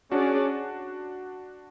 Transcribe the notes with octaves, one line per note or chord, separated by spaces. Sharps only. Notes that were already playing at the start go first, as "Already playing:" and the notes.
C#4 D4 F#4 G#4 D5